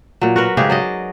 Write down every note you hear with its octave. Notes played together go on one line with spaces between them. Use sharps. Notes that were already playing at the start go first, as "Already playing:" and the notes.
A#2 F#3
F#4 A#4 B4
G#2 C#3 G4 G#4
F#3 D5 D#5